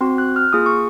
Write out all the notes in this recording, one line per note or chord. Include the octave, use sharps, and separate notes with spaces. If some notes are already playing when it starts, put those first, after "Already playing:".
C4 F#4 C6
F#6
F6
A#3 F4 G#4 D#6
C#6